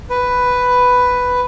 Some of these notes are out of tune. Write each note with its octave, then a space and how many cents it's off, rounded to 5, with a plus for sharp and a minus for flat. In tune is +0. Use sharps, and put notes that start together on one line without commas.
B4 +5